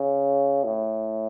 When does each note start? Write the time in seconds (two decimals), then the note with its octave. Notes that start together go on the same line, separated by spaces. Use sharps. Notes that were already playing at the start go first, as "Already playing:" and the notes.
Already playing: C#3
0.64 A2